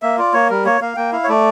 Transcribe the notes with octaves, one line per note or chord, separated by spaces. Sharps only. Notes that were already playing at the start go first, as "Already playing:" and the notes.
A#3 E5
F4 D5
A#3 C#5
G3 A#4
A#3 C#5
A#3 F5
A#3 G5
E4 F5
C#5
A3 D5